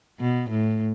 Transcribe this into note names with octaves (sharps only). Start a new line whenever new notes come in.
B2
A2